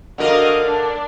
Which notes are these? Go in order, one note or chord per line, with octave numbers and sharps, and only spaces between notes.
D3 F#4 A#4 D#5 F5
D4